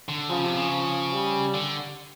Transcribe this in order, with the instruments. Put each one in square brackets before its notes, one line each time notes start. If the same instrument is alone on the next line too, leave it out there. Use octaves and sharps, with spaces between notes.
[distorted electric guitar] D3
[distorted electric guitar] C#3 [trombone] F3
[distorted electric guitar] C3
C#3
[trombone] F3
G3
[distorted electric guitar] D3